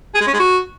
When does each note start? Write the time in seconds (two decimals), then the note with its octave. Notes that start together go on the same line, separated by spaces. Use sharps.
0.15 G#4
0.21 G#3
0.27 C#4
0.33 G#3
0.39 F#4